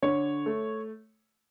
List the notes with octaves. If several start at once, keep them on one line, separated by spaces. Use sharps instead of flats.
D3 C#5
A3